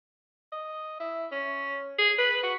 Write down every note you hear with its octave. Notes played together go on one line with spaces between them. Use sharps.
D#5
E4
C#4
G#4
B4
F#4